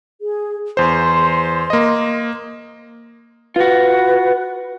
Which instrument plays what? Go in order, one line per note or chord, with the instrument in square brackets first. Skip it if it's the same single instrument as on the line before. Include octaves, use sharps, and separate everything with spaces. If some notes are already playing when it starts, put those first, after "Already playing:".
[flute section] G#4
[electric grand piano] E2 C5 [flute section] C6
[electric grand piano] A#3 D#5
[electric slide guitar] F4 F#4 [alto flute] B4